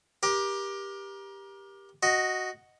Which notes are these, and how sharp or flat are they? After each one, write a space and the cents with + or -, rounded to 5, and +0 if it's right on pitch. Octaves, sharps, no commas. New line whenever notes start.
G4 +10 A#4 +30
F#4 +0 D#5 +0